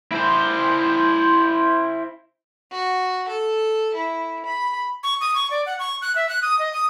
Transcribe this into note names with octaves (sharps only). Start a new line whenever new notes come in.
E4 C5
F#4
A4
E4
B5
C#6
D#6
C#6
D5
F#5
C#6
F#6
E5
F#6
D#6
D#5
D#6